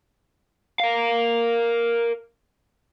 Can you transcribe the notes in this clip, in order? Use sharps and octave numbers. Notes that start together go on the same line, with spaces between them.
A#4 F5